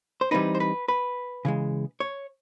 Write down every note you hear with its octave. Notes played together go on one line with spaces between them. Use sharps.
C5
E3 G3 C4 D#4 B4
C5
B4
B4
C#3 E3 G#3
C#5